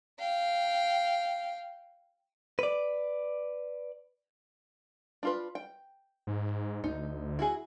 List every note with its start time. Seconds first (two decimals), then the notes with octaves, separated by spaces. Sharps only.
0.19 F5 G5
2.59 B4 D5
5.23 D4 F4 B4
5.55 G5
6.27 G#2
6.84 D2 D#4
7.39 E4 F#4 G#4